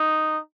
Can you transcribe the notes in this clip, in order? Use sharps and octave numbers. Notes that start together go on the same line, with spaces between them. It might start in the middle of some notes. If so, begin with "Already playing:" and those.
Already playing: D#4